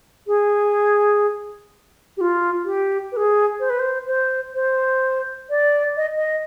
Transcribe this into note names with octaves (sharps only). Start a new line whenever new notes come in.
G#4
G4
F4
G4
B4
G#4
C5
B4
C5
C5
C5
D5
D#5
D#5